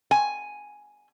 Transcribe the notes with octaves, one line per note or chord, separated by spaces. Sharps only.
G#5